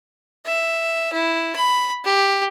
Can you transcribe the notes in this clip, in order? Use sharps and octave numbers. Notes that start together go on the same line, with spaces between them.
E5
E4
B5
G4